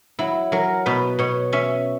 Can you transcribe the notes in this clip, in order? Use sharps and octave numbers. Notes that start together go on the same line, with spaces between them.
F#3 E4
F#3 A#4
B2 B4
B2 C#5
C#4 E5